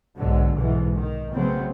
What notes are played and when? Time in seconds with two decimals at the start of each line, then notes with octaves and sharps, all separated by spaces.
0.17 B1 G#2 B2 D3 F#3
0.55 B1 G#2 B2 E3
0.95 D#3
1.33 C#3 F#3 A3 B3 C4